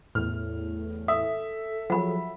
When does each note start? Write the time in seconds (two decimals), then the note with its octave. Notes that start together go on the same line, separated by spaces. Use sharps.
0.15 E2 A2 F6
1.08 A4 E5 D#6
1.90 F3 F#3 G#4 F#5 B5